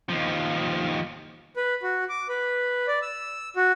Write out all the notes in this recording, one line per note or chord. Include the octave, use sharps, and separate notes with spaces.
D#2 F3
B4
F#4
D6
B4
D5
E6
F#4